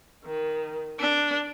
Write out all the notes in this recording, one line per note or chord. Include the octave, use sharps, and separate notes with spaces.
D#3
D4